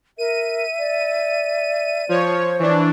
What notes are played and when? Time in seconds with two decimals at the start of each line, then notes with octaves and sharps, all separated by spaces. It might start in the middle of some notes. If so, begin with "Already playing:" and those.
0.18 A#4 E5 D#7
0.79 D5
2.09 F3 C5 C#5
2.59 E3 D4 C#6